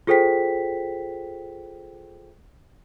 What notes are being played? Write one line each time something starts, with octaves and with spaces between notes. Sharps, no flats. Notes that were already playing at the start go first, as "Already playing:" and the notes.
F4 G#4 A4 C5 G5 B6